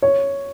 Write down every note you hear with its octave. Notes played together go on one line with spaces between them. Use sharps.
C#5